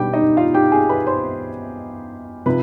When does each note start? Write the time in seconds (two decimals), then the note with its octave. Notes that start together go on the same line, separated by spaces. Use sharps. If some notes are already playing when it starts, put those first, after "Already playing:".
Already playing: B2 G3 B3 D4 G4 G5
0.13 D#4 D#5
0.37 F4 F5
0.54 G4 G5
0.72 G#4 G#5
0.89 B4 B5
1.07 C5 C6
2.46 C3 F3 B4 B5